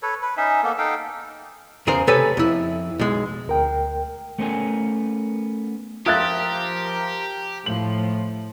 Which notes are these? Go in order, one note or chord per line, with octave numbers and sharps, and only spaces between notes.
A4 B4 C#5
B4
C#4 D#4 E5
A#3 B3 A4
D#4 A4 F5 G5
E2 C#3 G#4 A#4 C5
C3 A3 A4 B4 C#5 G#5
F2 E4
B1 G#3
D2 A#4 G5
A3 B3 C#4 A#4 G5 G#5
F3 F4 G4 A#4 E5 D#6 F#6 A6
A2 F3 F#7